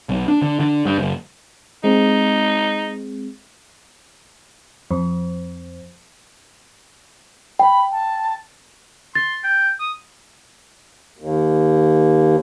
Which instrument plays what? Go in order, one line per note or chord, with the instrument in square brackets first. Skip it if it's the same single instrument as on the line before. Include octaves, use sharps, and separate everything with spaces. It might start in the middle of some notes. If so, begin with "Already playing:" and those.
[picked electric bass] B1
D4
D3
D3
G2
F#1
[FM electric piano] G#3 C4 [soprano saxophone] D#4
[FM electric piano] F2
[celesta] G5 [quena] B5
[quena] A5
[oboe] C6 [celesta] A6
[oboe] G5
D#6
[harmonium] D#2